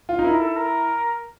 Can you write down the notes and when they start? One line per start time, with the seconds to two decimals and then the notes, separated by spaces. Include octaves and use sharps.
0.09 F4
0.19 D#4
0.24 E4 A#4
0.40 A4
0.56 A#4